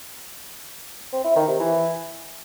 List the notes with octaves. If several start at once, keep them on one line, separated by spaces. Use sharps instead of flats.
C4
E4
D#3
C3
E3